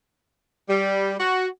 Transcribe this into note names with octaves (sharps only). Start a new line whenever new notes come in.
G3
F#4